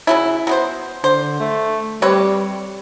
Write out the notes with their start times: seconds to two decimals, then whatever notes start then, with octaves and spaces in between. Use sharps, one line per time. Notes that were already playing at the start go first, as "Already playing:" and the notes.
0.07 C#3 F#3 E4
0.47 F#3 B3 C5
1.04 D3 C5
1.40 A3
2.02 G3 C4 B4 C#5